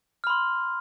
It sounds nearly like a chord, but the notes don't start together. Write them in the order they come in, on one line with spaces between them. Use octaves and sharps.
F6 B5 C6